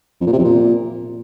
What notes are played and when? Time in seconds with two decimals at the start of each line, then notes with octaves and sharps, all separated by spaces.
0.21 F2
0.27 A#2
0.33 C3
0.39 F2
0.45 A#2